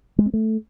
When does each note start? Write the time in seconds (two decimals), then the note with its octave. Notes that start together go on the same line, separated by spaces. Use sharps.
0.19 G#3
0.26 C4
0.34 A3